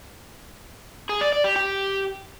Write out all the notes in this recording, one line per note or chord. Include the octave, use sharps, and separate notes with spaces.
G#4
D5
D5
G4
G4